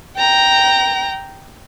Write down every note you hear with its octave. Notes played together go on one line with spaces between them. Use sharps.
G5 A#5